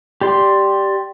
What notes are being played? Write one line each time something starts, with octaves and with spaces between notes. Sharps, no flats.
G4 D5 C6